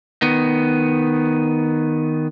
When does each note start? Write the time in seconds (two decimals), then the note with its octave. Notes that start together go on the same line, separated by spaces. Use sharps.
0.22 D#3 B3